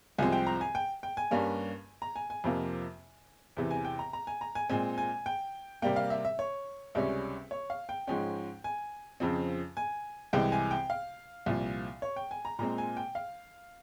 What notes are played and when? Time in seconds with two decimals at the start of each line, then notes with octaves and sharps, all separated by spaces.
0.18 C2 C3 F3 G#3 C4 G#5
0.32 G5
0.47 A#5
0.61 G#5
0.75 G5
1.03 G5
1.17 G#5
1.31 G2 G3 A#3 C#4
2.02 A#5
2.16 G#5
2.30 G#5
2.44 F2 C3 F3 A#3
3.57 E2 C3 E3
3.71 G#5
3.85 G5
3.99 A#5
4.13 A#5
4.27 G#5
4.41 A#5
4.55 G#5
4.69 A#2 G#3 C4 G#5
4.98 G#5
5.26 G5
5.82 C3 G3 A#3 G5
5.96 F5
6.10 E5
6.25 E5
6.39 C#5
6.95 C#2 C3 G3 C#4 E5
7.51 C#5
7.70 F5
7.89 G5
8.07 G#2 F3 G#3 C#4 G5
8.64 G#5
9.20 F2 C#3 F3 C4
9.77 G#5
10.33 C2 C3 E3 G#3 G5
10.52 G#5
10.71 G5
10.90 F5
11.46 C2 A#2 F3
12.02 C#5
12.16 G5
12.31 G#5
12.45 A#5
12.59 A#2 G#3 C4 A#5
12.78 G#5
12.97 G5
13.15 F5